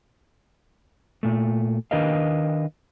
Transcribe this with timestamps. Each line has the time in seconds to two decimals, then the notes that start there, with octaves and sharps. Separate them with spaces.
1.23 A#2 A3
1.91 D#3 D4 A#4 B4 D#5 F5